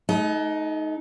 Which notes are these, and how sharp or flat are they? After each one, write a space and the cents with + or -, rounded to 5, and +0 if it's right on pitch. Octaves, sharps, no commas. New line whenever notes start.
A3 -40 D#4 +10